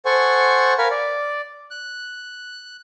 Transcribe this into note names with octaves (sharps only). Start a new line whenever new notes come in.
A4 C5 F#5 G#5 C#6
A#4 F5 G#5 B5
D5
F#6